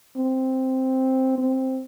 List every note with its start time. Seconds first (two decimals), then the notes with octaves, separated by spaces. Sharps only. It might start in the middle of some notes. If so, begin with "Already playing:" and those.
0.16 C4
1.38 C4